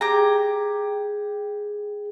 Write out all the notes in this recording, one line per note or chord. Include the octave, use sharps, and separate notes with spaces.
G4 G#4 A#5